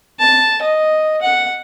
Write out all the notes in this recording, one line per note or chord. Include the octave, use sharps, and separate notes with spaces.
A5
D#5
F#5